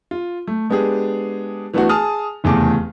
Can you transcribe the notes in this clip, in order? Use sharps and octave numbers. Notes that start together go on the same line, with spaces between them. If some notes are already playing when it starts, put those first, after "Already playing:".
F4
A3
G#3 B3 D4 G4 G#4
E3 A3 B3 D4 E4 F#4
G#4 G#5 A5 D#6 F6
F1 E2 C#3 A3 A5 D6